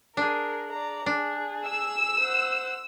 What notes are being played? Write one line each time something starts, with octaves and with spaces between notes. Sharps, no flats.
D4 G#4 A#4
D5 A#5
D4 G#4
E6
C5 F#5